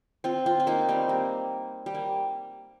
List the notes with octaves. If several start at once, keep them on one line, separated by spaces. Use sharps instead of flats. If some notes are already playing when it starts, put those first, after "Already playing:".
C4 F4
C4 F4
C4
A#3 D#4
G3 C4
A#3
G3
A#3